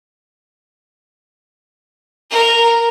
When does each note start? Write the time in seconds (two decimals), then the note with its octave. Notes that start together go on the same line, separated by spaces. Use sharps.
2.31 A#4